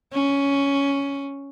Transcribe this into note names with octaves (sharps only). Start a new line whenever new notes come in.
C#4